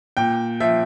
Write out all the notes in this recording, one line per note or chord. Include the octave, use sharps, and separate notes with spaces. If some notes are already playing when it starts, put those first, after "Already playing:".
A#2 G5
F3 E5